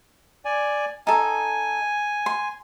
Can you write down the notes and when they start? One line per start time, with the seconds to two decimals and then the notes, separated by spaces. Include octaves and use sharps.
0.45 D5 G#5
1.07 D#4 A4 G#5
2.26 C6